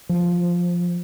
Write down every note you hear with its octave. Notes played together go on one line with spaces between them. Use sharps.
F3